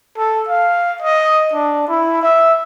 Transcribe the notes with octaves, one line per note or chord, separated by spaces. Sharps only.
A4
F5
D#5
D4
E4
E5